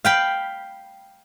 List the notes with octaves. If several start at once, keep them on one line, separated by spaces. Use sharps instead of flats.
F5 G5 B5